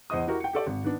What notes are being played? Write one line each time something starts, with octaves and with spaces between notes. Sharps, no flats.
E2 C5 D#5 D#6
E4 F#4 G4 A#4
G5 C#7
G4 A4 D5
G#1
D#3 B3 D4